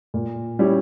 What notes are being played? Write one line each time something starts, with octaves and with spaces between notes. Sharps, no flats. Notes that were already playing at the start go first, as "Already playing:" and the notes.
A#2
G3 C#4 E4 G4